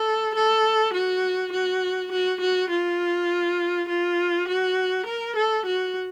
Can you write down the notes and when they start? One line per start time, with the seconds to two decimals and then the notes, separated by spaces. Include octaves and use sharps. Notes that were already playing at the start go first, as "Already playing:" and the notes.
Already playing: A4
0.35 A4
0.94 F#4
1.52 F#4
2.12 F#4
2.41 F#4
2.70 F4
3.89 F4
4.48 F#4
5.07 A#4
5.36 A4
5.66 F#4